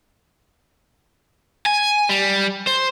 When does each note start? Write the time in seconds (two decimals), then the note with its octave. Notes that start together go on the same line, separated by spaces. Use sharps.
1.66 G#5
2.09 G3
2.67 C5